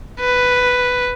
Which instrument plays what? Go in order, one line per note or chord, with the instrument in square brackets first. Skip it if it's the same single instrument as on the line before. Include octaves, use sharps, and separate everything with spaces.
[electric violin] B4